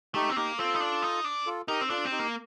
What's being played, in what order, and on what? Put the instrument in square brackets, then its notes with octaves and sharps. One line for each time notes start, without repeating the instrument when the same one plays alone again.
[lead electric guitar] A3 [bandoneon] D#4 G4
[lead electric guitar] C4
[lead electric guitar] A#3 [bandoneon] D#4 G4
[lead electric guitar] C4 [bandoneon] F4 A4
[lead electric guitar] D#4
D4
D#4
D4
[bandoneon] F4 A4
[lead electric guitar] D#4 [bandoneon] G4 A#4
[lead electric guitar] C4
[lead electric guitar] D4 [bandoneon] F4 A4
[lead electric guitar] C4
[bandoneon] D#4 G4
[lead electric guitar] A#3